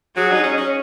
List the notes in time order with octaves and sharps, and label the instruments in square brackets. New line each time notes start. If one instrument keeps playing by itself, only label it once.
[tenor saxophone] F#3 [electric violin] G#4
[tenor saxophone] D#4
C#4
C#4